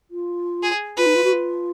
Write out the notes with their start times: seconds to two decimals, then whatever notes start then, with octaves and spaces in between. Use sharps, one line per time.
0.10 F4
0.63 G#4
0.97 F4 B4
1.06 D#4
1.15 F4
1.24 F#4
1.32 F4